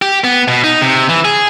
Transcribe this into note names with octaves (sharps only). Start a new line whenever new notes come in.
G4
B3
B2
D#4
C3
E3
G#4